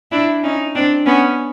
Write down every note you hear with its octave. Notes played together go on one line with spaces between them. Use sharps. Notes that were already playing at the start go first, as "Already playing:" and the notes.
D4 E4
C#4 D#4
C4 D4
B3 C#4